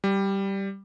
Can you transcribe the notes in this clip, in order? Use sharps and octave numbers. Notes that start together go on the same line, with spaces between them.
G3